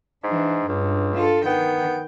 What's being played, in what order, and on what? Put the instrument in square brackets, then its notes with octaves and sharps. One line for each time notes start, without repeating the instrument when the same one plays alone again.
[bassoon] G#2 [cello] E3 D4
[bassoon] C#2 [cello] G2
[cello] F4 A4
[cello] D#3 G5 [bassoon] B3